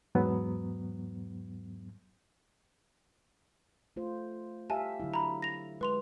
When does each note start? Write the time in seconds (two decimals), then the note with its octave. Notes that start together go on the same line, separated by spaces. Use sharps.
0.15 E2 G#2 F#3 B3
3.96 A3 F4 C5
4.70 G4 E5 F5 G#5 A5
5.00 D3 F#3 E4
5.14 A#5 B5
5.42 A#6 F7
5.81 G#3 B4 C6 F7